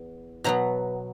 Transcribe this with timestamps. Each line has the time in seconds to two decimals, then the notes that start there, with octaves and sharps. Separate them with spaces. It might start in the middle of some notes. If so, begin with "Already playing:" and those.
Already playing: E2
0.44 B2 F#3 B3 A#5